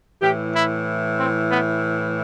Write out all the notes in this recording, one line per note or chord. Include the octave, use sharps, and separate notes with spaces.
A2 E3 G4
E4
C4
B3